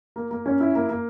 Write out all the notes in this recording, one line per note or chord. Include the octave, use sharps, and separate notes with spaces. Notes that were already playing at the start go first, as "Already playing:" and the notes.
A#3
A#3
C#4
E4
A#3
A#3